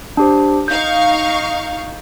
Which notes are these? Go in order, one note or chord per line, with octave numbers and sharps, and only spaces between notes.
D4 G4 C5
D#4 F5 C#6 G6